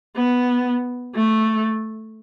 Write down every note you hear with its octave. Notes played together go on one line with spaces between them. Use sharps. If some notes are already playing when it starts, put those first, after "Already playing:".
B3
A3